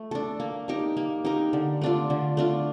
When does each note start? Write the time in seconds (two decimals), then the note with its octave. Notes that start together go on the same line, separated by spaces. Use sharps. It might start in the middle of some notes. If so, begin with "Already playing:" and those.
Already playing: A3
0.11 D4 A4
0.40 A#3
0.68 D#4 G4 A#4
0.97 A#3
1.25 D#4 G4 A#4
1.53 D3
1.81 A3 D4 F4
2.10 D3
2.37 A3 D4 F4